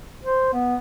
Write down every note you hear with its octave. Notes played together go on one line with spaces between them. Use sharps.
C5
B3